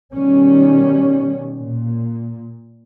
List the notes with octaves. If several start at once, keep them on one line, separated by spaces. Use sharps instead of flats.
B2 D#3 G3 C#4
A#2